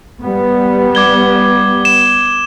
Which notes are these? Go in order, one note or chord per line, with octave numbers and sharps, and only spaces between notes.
G3 B3
D6 G#6 G7
E7